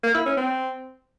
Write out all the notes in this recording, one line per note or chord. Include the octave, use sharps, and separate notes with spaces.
A#3
E4
C#4
C4